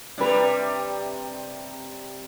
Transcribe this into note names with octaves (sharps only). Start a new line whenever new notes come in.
C3 G3 D4 B4